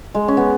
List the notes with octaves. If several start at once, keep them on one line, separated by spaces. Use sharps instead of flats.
G#3
C#4
B3